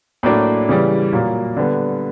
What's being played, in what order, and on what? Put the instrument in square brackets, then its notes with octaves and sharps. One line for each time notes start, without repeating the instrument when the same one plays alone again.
[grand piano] A2 F#3 A#3 D4
C#3 E3 G3
A#2 F#3 A#3
D3 G3 B3